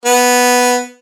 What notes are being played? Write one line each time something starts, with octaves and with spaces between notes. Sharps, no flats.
B3